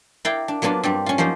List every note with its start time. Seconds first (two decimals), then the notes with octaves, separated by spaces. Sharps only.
0.25 E4 A#4 D5 F5 G5
0.48 D4
0.62 F#3 A#3 B3 D4 F4
0.83 G2 G3 C4
1.06 C#4 F4
1.18 F3 F#3 A#3 D#4 C5